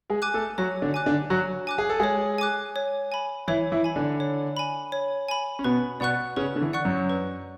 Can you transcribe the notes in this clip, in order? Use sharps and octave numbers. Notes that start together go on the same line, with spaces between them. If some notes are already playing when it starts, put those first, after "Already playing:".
G#3 G#4
G#5 D6 F#6
A3 A4
F#3 F#4 C#5
D3 D4
G#5 D6 F#6
D3 D4
F#3 F#4 C#5
G#5 D6 F#6
G#4
A4
G#3 G#4 C#5
G#5 D6 F#6
C#5
G#5 B5
E3 E4 C#5
E3 E4
G#5 B5
D3 D4
C#5
G#5 B5
C#5
G#5 B5
C#4
B2 B3 B4
B2 B3 D5 F#5 C#6 F#6
C#3 C#4 B4
D3
E3
D5 F#5 C#6 F#6
F#2 F#3
B4